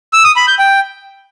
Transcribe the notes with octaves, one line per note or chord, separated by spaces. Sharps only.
E6
D#6
B5
G6
G5